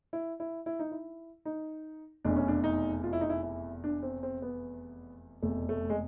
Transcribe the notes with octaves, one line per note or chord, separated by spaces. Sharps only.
E4
E4
E4
D#4
E4
D#4
F1 E2 B2 D4
C#4
D4
D#4
F4
E4
D#4
E4
E4
D4
C4
C4
B3
F1 E2 B2 A3
A3
G#3